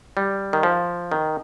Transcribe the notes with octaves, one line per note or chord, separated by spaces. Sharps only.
G3
D#3
F3
D#3